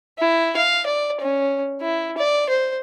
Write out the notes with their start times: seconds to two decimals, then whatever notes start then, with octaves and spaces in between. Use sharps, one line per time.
0.18 E4
0.57 F5
0.86 D5
1.20 C#4
1.81 E4
2.17 D5
2.49 C5